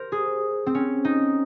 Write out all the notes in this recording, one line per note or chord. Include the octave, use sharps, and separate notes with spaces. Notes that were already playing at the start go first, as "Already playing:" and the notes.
Already playing: A#4 C5
G#4
C4
C#4
D#4